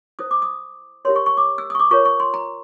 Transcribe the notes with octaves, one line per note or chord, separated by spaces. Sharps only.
E4 A4 C5 D#6
D6
D#6
E4 G4 A#4 C#5 C6
C#6
C#6
D6
E6
D#6
C#6
D6
F4 A#4 C#5 C#6
C#6
C6
A#5